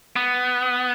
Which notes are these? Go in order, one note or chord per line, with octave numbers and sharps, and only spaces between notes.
B3